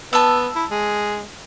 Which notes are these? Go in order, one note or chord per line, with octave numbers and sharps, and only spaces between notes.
B3 A5 E6
E4
G#3